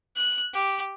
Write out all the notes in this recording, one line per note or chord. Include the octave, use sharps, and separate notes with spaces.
F#6
G4